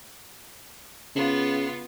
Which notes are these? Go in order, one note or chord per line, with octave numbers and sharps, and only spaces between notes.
C#3 B3 F4